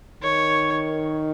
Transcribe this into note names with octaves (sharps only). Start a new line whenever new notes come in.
D#3 C#5